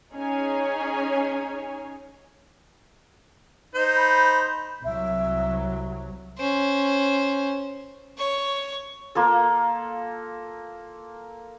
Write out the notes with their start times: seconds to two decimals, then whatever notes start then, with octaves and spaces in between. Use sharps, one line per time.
0.14 C#4 D#4 G#4 C#5 G#5
3.75 D#4 C5
3.97 B5
4.84 C2 F#3 E5
6.38 C#4 C5
8.17 C#5 C#6
9.15 A#3 F4 A4